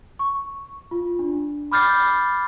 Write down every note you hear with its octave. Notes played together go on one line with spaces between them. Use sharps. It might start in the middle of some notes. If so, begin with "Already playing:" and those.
C#6
F4
D4
B5 D6 F6 G6 A6 C7